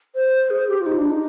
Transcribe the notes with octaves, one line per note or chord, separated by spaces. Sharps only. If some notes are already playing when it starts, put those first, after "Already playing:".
C5
G#4
G4
F4
D#4
D4
D#4